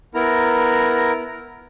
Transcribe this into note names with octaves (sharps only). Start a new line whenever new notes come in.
B3 E4 A#4 A#5